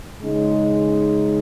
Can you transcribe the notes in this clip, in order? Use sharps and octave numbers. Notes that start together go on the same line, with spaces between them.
C#3 G#3 D#4